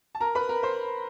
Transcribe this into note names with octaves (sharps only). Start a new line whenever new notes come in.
A5
A#4 A#5
B4 B5
A#4 A#5
C5 C6